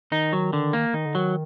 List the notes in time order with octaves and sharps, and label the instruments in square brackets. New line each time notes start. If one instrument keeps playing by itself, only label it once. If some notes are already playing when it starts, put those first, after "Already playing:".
[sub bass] D#3 [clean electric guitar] D#4
[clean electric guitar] F#3
D3
A#3
[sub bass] D#3 [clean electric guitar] D#4
[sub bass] D3
[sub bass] D#3 [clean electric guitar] F#3